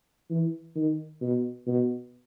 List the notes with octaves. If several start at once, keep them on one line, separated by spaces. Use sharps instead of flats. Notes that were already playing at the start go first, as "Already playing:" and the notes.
E3
D#3
B2
B2